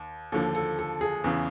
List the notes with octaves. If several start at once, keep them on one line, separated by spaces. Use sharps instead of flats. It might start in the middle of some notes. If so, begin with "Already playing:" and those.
Already playing: D#2
D#2 D3 F3 A4
A4
A4
G#4
E2 C#3 E3